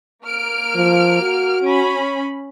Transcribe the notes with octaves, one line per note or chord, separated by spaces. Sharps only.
A#3 F6 D7
F3
F#4
C#4 B5